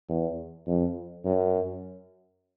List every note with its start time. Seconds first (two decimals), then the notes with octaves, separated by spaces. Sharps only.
0.09 E2
0.67 F2
1.25 F#2